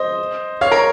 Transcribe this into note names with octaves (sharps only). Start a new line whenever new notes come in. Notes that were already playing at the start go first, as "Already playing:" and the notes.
Already playing: C5 D#5
C#5 F5
A#4 C#5